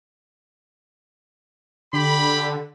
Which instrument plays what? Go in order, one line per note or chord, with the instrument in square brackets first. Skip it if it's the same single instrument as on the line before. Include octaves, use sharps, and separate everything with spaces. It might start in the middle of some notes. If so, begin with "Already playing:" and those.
[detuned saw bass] D3 [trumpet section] G4 B5